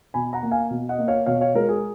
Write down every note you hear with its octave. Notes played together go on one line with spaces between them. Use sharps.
B2 G#5 B5
F#5 A#5
A#3
F5 G#5
B2
D#5 F#5
A#3
C#5 F5
B2 C#5 F5
C#5 F5
G#3 A#4
G#4